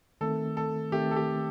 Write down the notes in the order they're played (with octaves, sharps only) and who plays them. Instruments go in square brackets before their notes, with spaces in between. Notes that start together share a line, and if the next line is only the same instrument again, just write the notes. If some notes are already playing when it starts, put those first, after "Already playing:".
[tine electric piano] D#3 A3 C4 [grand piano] A4
[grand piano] A4
[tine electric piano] D#3 A3 C4 [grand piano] G4
[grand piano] A4
G4